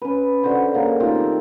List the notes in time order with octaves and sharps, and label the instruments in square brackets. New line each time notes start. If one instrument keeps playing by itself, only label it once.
[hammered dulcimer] C#4 B4
D3 F#4 C5 B5
C#3 A#3
D#3 A3 F4 G4
C4